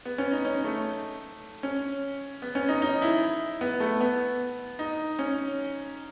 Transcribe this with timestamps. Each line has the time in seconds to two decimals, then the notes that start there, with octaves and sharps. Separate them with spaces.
0.05 B3
0.18 C#4
0.32 D#4
0.45 C#4
0.64 A3
1.63 C#4
2.42 B3
2.55 C#4
2.69 D#4
2.82 D#4
3.02 E4
3.61 B3
3.80 A3
4.01 B3
4.79 D#4
5.19 C#4